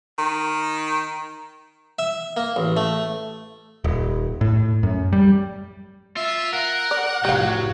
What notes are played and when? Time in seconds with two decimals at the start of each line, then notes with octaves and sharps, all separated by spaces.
0.19 D#3
1.99 E5
2.37 A#3
2.56 A1
2.77 A3
3.84 D#1
4.41 A2
4.83 F#2
5.13 G3
6.17 F4 E5
6.53 A#4 F#5
6.91 D5
7.25 F1 A2 F#3 G4 F5